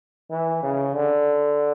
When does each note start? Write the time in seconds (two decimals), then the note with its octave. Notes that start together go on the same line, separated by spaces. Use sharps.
0.31 E3
0.63 C#3
0.94 D3